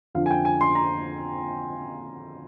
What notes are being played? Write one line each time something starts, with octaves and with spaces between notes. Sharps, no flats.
F2 D3 F3 C4 F4 F5
G#5
G5
G#5
C6
A#5